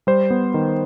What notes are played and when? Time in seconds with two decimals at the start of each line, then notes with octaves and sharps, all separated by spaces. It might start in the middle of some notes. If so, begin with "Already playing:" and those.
0.07 G3 C5
0.30 B3
0.54 D#3